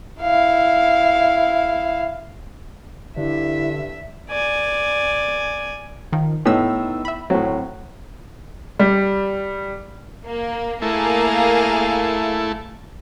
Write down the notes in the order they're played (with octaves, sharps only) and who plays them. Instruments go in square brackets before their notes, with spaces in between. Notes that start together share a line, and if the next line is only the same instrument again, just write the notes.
[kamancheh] E4 F5
[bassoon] G2 [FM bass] D3 [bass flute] E4 [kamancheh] E5
[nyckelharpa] D5 G#5
[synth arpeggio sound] D#3 F3
[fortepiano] A2 [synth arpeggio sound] B3 D#4 E6
[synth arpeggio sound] E5 B5
[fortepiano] A2 F#3 [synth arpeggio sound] C4
[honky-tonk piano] G3
[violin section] A#3
[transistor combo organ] A3 E4 [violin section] A#3 G#4 F5